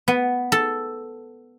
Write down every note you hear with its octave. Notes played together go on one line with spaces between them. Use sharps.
B3
A4